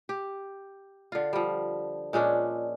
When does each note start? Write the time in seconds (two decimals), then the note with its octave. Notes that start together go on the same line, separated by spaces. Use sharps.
0.09 G4
1.12 D3 F4
1.33 F3 G3
2.13 A#2 G#3 C#4 D4